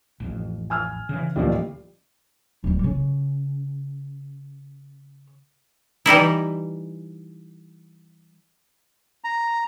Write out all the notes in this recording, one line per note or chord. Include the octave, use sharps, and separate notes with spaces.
A1 F2
G#5 E6 F6
C#3 E3
A1 D2 A#2 E3 F3 G3
D1 G3
C#3
E3 G3 D#4 E4
A#5